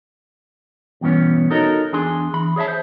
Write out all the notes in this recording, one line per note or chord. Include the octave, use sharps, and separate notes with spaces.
E2 G2 B2 E3 B3 C#4
D#4 F#4 A4 A#4 C#5 D#5
E2 D4 G#4 G#5 C6
E3 B5
G#4 C#5 D#5 E5 A5
C5